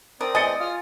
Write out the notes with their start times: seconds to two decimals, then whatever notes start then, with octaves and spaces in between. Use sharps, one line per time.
0.21 C4 A#4 D5 D#6
0.35 E2 D#5 G#5 A6 C#7
0.60 F4 D#6 F6